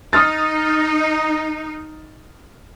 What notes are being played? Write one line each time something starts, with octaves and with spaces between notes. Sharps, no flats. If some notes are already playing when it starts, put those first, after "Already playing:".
D#4 D#6 F6 A6